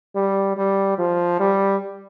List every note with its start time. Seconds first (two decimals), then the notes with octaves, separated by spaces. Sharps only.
0.15 G3
0.57 G3
0.98 F3
1.40 G3